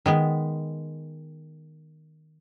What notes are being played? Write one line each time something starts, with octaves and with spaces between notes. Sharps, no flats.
D#3 G#3 B3